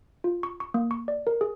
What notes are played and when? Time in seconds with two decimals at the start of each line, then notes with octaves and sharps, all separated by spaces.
0.24 F4
0.43 C#6
0.60 C#6
0.74 A#3
0.91 C#6
1.08 D5
1.27 A#4
1.41 G#4